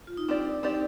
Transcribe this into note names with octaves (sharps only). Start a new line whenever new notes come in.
F4
D#4
C4 D4 G4 D5
C4 D#4 G4 D5